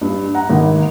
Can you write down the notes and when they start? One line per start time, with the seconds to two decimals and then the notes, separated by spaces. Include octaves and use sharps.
0.01 G2
0.35 F#5 A#5
0.49 G#1